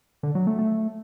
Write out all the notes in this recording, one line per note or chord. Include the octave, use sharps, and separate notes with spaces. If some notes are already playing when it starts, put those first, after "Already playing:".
D3
F#3
A3
A3